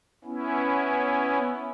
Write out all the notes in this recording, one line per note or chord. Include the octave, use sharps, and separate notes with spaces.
B3 C#4 E4